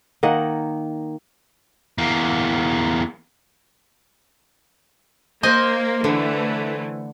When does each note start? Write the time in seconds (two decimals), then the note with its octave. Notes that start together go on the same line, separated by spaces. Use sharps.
0.23 D#3 A#3 D#5 F#5
1.98 E2 A#3
5.43 A#3 C5 D#5 G#5
6.04 D3 E3 A3